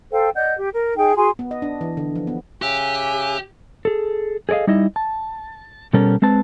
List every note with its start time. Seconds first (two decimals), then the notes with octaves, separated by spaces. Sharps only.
0.11 A4 C5 F5 G5
0.35 D5 D#5 F#5 G6
0.56 G4
0.72 A#4
0.96 D#4 G#4 G5
1.16 F#4 G#4 G#5 C6
1.39 B3
1.51 D#5
1.62 D4
1.81 E3
1.97 D3
2.15 F3
2.27 B3
2.62 C#3 G4 E5 G#5 F#6
3.85 G#4 A4
4.49 G#4 A4 D5 D#5 F5
4.67 G3 D#4 E4 D#5 E5
4.96 A5
5.93 B2 G3 B3 C#4 A4 A#4
6.22 G#3 C4 B4 A5